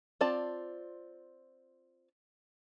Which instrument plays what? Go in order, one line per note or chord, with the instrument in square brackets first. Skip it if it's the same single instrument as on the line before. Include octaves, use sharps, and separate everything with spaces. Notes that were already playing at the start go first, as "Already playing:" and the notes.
[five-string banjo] C4 F4 D5 A5